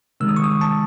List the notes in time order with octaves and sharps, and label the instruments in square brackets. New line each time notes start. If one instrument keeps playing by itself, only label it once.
[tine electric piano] C3 D#3 G#3 E6
D#6
C#6
D#6
A5